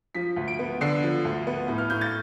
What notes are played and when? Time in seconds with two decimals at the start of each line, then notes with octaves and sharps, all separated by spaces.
0.15 F3 B6
0.36 D2
0.48 D7
0.59 B3
0.81 D3 C7
1.03 F3
1.25 D2
1.47 B3
1.68 A2
1.78 F6
1.90 A2 G6
2.01 A6